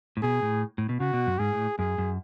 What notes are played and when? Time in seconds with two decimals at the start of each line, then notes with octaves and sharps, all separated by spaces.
0.17 A2
0.23 B2 G#4
0.42 A2
0.78 A2
0.89 B2
1.00 C#3 F#4
1.13 B2
1.27 F#2
1.39 G#2 G#4
1.53 A2
1.79 F#2 G#4
1.98 F#2